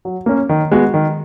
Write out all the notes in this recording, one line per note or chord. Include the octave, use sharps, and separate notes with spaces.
F#3
A#3 C#4
D#3
G#3 B3 F#4
D#3